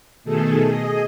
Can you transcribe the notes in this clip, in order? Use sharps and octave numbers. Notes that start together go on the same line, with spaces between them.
B2 D#3 A3 G#4 A4
G#4 D#5